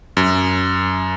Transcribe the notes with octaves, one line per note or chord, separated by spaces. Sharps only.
F#2